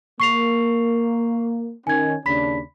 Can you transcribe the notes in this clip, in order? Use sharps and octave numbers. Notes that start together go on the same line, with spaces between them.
A#3 C#6 C7 F7
D#3 C#4 G#5 G#6
D#2 C#3 D4 B5 B6